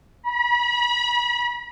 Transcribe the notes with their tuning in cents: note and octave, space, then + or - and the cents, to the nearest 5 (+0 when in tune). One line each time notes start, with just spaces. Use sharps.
B5 -40